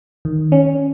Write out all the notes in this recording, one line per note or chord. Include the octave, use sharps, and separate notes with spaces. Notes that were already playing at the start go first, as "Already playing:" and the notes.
D#3
C#4